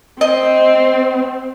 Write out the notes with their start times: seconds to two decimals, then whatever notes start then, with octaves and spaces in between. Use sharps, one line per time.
0.21 C4 D#5